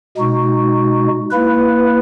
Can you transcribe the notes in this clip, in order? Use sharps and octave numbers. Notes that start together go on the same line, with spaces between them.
B2 G#3 D#4 F#4
A#3 E4 B4